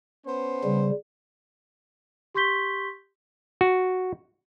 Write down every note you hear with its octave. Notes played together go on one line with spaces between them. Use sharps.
B3 C#4 C5
C#3 G3
G4 C6 C#6 G6 B6 G7
F#4